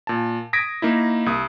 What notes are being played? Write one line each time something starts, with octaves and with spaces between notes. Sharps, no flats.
A#2 A5
D#6 G#6 A#6 B6 D7
A#3 D#4 E4
C2 D#6